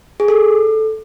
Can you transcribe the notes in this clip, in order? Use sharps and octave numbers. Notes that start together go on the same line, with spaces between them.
G#4
A4